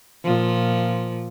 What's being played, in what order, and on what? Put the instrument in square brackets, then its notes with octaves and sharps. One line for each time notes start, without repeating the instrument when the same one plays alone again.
[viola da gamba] A#2 F3